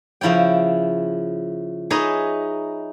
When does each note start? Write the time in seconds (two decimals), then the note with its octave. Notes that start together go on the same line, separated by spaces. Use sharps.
0.21 C#3 F3 E4 C#5 G5
1.90 D#4 G#4 B4 C#5 D#5 E5